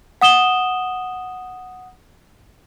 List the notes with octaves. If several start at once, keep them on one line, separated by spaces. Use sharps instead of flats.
F#5 D#6 E7 G7